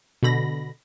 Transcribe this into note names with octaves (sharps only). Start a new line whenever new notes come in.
B2 D3 B5 A#6